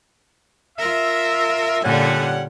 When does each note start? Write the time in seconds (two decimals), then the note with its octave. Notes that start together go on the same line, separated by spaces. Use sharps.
0.79 F4 A#4 E5
1.84 A#2 D3 G3 C#4 F#5